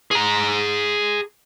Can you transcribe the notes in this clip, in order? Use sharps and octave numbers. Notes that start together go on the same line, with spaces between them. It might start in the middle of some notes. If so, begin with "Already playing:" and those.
G#4 A#5